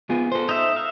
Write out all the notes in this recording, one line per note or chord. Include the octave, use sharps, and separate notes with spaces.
B3 F4 G#4
A4 C5
D#4 E5
E5 F5